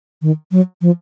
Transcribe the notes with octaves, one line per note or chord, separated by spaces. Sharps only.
D#3
F#3
F3